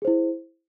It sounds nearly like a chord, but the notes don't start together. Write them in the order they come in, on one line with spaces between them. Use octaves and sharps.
G#4 C5 E4